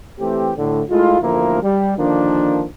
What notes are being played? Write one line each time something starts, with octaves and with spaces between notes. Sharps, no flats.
E3 A3 C4 G4
A2 D3
G#3 A3 E4 F4
A1 D2 F3 A#3 E4 A#4
G3
D3 D#3 F3 A#3 D4